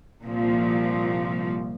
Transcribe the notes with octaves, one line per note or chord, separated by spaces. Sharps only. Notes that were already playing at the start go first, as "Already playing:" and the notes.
C2 A#2 F3